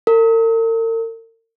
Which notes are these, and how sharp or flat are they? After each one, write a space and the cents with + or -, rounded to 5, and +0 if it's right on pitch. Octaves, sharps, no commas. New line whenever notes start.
A#4 -45